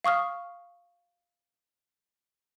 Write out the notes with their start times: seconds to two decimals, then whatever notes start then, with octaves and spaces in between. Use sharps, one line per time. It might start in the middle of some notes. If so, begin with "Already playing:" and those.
0.04 F5 C#6 D#6 F6